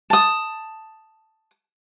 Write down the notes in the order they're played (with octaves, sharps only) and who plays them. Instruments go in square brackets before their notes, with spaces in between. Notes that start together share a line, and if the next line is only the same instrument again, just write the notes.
[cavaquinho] A5 D#6